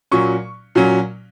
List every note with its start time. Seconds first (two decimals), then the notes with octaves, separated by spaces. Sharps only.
0.11 A#2 F#3 C#4 C#6
0.75 A#2 F#3 C#4